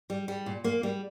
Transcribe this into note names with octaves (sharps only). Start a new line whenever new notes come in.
G3
G3
A#2
A#3
G3